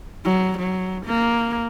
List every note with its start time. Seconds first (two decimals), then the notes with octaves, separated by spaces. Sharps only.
0.25 F#3
0.59 F#3
1.06 A#3